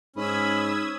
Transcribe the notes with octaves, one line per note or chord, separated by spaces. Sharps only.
G#2 C#4 B5 D#6 E6 G#6